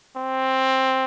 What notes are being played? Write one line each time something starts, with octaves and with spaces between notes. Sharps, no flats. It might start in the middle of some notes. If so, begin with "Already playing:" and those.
C4